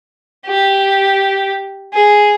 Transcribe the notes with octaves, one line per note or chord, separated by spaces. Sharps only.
G4
G#4